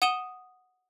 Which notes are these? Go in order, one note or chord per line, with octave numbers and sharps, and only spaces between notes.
F#5 D#6 D#7 E7 G7